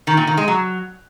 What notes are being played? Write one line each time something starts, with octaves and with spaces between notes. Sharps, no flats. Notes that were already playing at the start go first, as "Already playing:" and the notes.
D#3
A#2
D#3
G#3
F#3